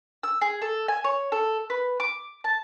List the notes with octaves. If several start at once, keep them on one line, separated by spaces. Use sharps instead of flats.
E6
G#4
A4
G#5
C#5
A4
B4
D6
A5